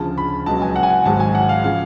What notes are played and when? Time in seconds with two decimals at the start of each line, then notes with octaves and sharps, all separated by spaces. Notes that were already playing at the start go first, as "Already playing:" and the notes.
Already playing: D2 C#3 F3 A5
0.18 B5
0.46 C#2 B2 F#3 A5
0.62 G#5
0.76 F#5
0.83 G#5
0.90 F#5
1.05 G#1 G#2 F#3 A5
1.20 G#5
1.35 F#5
1.49 F5
1.64 C#3 F3 F5